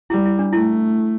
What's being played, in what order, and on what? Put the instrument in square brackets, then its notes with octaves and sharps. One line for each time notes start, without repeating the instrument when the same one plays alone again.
[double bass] G3 [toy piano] E4
[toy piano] E4
D4
[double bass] A3 [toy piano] E4